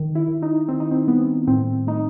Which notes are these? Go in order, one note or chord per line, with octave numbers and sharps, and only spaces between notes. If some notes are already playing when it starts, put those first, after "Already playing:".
Already playing: D#3
E4
D#3
D#4
D#3 C4
D#4
C4
G3 B3
A2 C4
A3 D#4